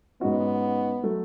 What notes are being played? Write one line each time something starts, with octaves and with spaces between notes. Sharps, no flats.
G#2 G#3 B3 C#4 F#4
F#3 A3